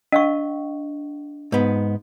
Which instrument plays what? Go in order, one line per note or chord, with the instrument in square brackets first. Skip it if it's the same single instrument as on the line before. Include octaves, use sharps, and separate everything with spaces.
[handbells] D4 [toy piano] D#5 F5 C#6
[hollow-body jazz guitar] G#2 B3